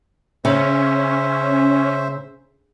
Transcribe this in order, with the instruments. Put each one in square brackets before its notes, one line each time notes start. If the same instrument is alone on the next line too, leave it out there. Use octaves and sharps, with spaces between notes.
[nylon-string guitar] C#3 [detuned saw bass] C#4 [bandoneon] C5 E5